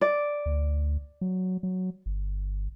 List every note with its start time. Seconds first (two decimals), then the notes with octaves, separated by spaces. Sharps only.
0.01 D5
0.46 D2
1.21 F#3
1.63 F#3
2.06 G1